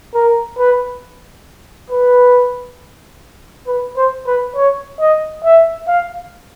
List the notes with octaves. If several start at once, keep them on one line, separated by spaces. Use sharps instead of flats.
A#4
B4
B4
B4
C5
B4
C#5
D#5
E5
F5